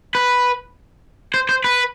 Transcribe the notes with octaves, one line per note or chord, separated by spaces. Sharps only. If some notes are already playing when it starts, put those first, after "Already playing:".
B4
C5
C5
B4